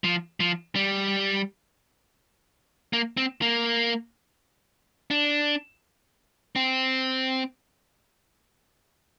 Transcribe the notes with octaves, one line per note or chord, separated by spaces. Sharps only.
F3
F3
G3
A#3
C4
A#3
D4
C4